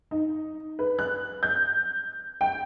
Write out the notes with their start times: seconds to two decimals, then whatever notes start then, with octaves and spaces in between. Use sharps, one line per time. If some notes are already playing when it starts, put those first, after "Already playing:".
0.11 D#4
0.79 B4
0.99 F#6
1.43 G6
2.41 G5